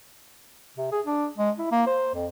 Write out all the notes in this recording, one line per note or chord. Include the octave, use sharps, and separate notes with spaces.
C3
G#4
D4
G#3
E4
A#3
C5
F2